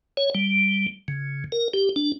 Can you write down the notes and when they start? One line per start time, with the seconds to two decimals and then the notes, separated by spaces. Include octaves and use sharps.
0.17 C#5
0.35 G3
1.08 C#3
1.52 A#4
1.74 G4
1.96 D4